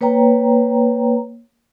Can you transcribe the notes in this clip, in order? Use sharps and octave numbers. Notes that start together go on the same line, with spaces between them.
A#3 B4 C#5 G5 A#5